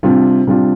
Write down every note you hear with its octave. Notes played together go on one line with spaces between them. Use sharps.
C3 G3 D4 F4
C3 G3 D4 F4